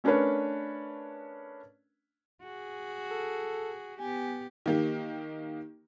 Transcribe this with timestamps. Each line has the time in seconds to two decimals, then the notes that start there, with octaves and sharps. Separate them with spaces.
0.04 A3 C#4 D4 A#4 B4 C#5
2.43 F#4 G#4
3.11 A4
3.99 B3 G4 G#5
4.66 D#3 A#3 G4